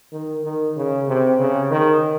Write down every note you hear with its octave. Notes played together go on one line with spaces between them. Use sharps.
D#3
D#3
C#3
C3
C#3
D#3